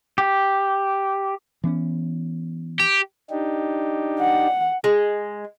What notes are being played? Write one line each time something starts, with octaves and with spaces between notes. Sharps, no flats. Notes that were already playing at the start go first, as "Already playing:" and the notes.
G4
E3 B3 C#4
G4
D4 D#4 G4
F#5
G#3